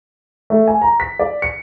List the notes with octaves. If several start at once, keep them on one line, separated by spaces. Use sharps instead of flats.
A3
G#5
A#5
B6
D5
C#7